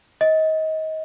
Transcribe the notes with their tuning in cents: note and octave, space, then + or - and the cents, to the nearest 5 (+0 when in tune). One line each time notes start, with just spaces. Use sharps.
D#5 +25